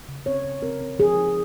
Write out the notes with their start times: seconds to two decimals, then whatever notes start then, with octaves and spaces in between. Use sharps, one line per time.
0.08 C#3
0.26 C4 C#5
0.44 C#3
0.62 C4 A#4
0.81 C4
0.99 F3 G#4
1.17 D#4